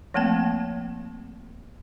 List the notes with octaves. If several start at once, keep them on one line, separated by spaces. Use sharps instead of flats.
F3 A3 A#3 C4 G5